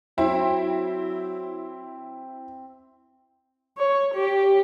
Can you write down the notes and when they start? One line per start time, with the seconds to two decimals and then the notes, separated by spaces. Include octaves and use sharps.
0.18 F#3 C4 E4
3.78 C#5
4.14 G4